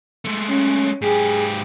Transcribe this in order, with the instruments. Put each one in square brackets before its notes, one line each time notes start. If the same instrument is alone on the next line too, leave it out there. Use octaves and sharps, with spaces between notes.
[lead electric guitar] G#3 A3
[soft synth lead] C#4
[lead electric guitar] G#2 G4 [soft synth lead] G#4